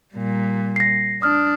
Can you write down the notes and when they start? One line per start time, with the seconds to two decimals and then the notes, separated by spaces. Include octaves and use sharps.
0.14 A#2 G3
0.76 A#6 C7
1.22 D4 D#6 F6